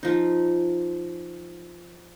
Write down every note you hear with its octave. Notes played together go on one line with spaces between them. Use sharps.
F3 D#4